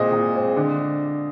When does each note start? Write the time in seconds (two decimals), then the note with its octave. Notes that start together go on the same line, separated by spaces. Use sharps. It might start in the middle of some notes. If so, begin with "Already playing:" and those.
Already playing: A#2 G#3 C4 D#5
0.12 A#2
0.34 G#3 C4
0.56 D3